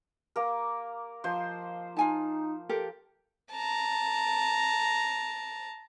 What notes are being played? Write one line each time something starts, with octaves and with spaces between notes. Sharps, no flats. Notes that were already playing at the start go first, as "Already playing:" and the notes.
A#3 A#4
F3 C5 D#5 C6
D#4 F4 G#5 A5
G4 A4 A#4
A5 A#5